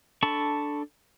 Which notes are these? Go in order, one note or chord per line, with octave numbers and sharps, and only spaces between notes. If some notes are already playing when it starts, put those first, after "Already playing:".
D4 A4 A5 B5 C#6